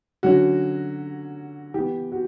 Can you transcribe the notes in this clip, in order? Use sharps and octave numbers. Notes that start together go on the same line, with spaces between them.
D3 F#3 C#4 F#4
E3 B3 G4
F#4